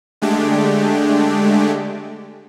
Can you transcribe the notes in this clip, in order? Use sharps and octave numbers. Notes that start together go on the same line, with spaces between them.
D3 G#3 A3 D4 G4